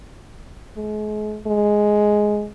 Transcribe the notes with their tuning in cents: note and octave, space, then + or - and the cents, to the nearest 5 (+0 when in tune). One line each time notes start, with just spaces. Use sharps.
G#3 +40
G#3 +5